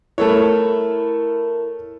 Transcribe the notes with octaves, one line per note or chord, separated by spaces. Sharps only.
A3 E4 A4 A#4 C#5 A5